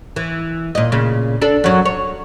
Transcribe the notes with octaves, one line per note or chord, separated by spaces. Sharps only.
E3
A#2 D#5
A#2 C#3
D4 A4
F#2 F#3
C#5